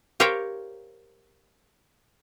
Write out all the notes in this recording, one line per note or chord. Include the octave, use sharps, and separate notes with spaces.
G4 A#4 C5 C#5 F5 G5